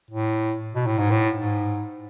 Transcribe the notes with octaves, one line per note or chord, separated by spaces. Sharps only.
A2
B2
A2
G#2
A2
G#2